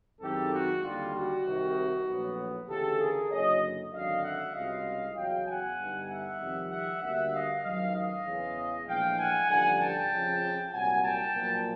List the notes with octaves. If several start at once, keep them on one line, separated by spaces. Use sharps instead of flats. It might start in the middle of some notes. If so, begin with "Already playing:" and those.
F#2 D#3 G#3 C4 E4 G4 A4
F#4
D#2 D3 G3 F4
F#4
C2 C3 D#3
A#1 A2 F#3 B3
D2 C#3 E3 G4 A4
G#4 A#4
F#1 F#2 D3 C#5 D#5
G#1 F#2 D3 F#3 D#5 F5
E5 F#5
C2 B2 G#3 C#4 F4 D#5 F5
E2 C#3 F#3 F5 G5
F#5 G#5
G2 D3 G3 B3 D#4
E5 F#5
F2 C3 D#3 G3
E5 F#5
D2 D3 G3 A#3 E5 F#5
D#5 F5
A1 G#2 D#3 F#3 D#5 F5
D#5 F5
E2 C#3 E3 G#3
A#1 A2 E3 G#3 F5 G5
F#5 G#5
A1 G2 D3 F3 F#5 G#5
G5 A5
F2 C#3 F3
C2 A#2 F#3 F#5 G#5
G5 A5
B1 A#2 F3 A#3